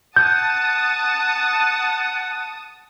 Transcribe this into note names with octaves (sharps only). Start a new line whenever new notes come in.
F#5 A5 D#6 G6